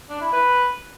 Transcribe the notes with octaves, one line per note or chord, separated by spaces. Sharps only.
D4
E4
B4